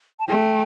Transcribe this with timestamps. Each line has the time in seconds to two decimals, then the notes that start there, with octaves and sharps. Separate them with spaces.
0.20 A5
0.28 A3 G5